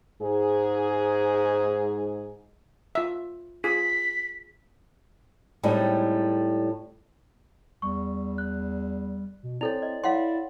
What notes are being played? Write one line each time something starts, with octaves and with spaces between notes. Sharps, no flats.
G#2 G#4
F4 E5
F4 G#4 B6
A2 G3 G#3 C4 D#4
E2 G3 C#6
F#6
B2
C4 E4 A4 C#5 D5 F7
D#5
E4 C#5 F5 F#5 C6